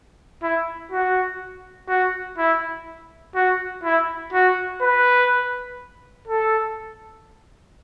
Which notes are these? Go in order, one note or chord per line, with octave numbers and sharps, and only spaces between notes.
E4
F#4
F#4
E4
F#4
E4
F#4
B4
A4